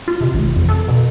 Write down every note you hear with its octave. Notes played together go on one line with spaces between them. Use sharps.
F4
C3
A1
F2
A4
B2